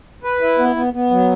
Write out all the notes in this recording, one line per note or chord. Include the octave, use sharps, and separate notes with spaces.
B4
E4
B3
B3
B3
F#3